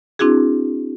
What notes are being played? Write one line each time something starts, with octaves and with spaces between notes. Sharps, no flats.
C4 D4 E4 F#4 G#4